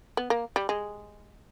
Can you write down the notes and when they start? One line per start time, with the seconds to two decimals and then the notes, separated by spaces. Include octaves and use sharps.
0.17 B3
0.30 A#3
0.56 G3
0.69 G#3